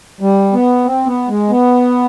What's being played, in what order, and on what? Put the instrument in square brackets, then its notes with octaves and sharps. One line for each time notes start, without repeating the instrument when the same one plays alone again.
[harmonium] G3
B3
C4
B3
G#3
B3